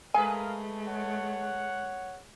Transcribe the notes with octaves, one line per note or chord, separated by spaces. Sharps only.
G#3 A3 G#4 A#4 B4 F5 G#5
C#5 F#5